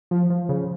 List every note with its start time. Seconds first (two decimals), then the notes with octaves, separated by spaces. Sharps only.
0.11 F3
0.30 F3
0.49 C#3